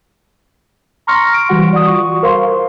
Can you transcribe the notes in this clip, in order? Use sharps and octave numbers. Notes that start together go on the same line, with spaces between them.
A#5 C6 C#6 F6 A#6 C#7
A#6 D7
E3 G3 F#4 F#5
D5 F#5 D#6
F4 F#4 C#6
A#4 C5 F5 C6